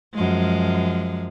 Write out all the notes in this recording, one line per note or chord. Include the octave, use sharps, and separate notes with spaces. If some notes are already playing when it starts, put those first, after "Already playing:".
F#2 F3 G#3